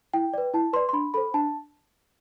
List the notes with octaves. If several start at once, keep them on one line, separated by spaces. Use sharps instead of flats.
E4 G5
B4 D5
E4 A5
B4 D5 C6
C6
D4 B5
A4 C5 B5
D4 A5